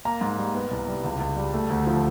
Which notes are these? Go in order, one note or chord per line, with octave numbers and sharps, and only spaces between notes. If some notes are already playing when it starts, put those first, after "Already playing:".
A#3 A#5
G#2
G3
B3
C2
G3
C#2
C#2
G3
A3
D2
F3